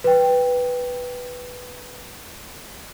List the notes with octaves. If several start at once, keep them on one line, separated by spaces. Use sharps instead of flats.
B4 G5